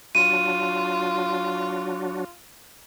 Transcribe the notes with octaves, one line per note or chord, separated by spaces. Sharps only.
F#3 D4 F4 F#4 D#7